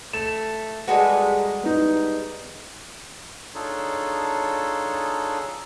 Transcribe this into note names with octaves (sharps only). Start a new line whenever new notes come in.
A3 E7
G3 G#3 F#4 A4 B4 G#5
A#5
B3 D#4
D4 D#4 F4 G#4 A4 C#5